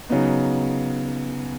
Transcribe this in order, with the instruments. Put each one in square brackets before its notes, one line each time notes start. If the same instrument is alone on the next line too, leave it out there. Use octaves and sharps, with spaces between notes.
[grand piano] C#3 F#3 B3 D#4